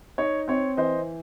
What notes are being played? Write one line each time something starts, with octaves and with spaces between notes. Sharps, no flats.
D#4 C#5
C4 C#5
E3 C5 D#5